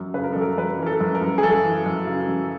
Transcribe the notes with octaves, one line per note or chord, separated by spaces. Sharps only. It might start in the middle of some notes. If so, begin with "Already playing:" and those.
Already playing: F#2
C#3 B4
A#4
F#2 A4
A#4
F#2 B4
E3 A#4
A4
F#2
A#4
F#2
G#4
F#2 A4
E3
F#2
C#3
F#2